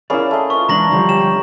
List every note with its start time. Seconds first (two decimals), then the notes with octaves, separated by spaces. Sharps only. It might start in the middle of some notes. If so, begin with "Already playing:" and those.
0.10 A#3 C#4 E4 G#4 D5 B5
0.31 A3 D#5
0.50 F4 B4 C#6
0.69 E3 G#3 D4 A#5 A#6 F#7
0.91 D3 F3 G3 C#5
1.09 G4 C#5 G5 E7